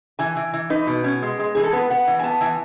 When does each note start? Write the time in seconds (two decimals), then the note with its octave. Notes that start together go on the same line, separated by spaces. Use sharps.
0.19 E3 G#5
0.36 E3
0.54 E3
0.70 D#4 B4
0.87 B2
1.04 C#4
1.22 G#3
1.39 G#3
1.55 E3 G#4
1.63 A4
1.73 B3 B4
1.90 B3 F#5
2.07 E3
2.19 G#5
2.23 B3 A5
2.41 E3 G#5